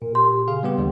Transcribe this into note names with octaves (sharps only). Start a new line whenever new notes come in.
A#2 A#4
G4 C6
C#3 G#4 F5
G3 B3 G4
D#2 D3 G3